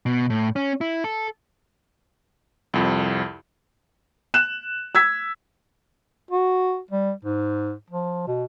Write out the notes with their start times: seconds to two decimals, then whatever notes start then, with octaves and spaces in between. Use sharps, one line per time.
0.06 B2
0.30 A2
0.56 C#4
0.81 E4
1.04 A4
2.74 C2 F2
4.34 F#6 E7
4.95 E6 G#6 B6
6.31 F#4
6.91 G3
7.24 G#2
7.90 F3
8.27 B2